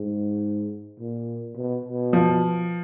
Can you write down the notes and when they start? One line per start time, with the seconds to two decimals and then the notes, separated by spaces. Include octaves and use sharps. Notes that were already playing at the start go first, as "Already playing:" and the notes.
Already playing: G#2
1.00 A#2
1.57 B2
1.85 B2
2.13 F3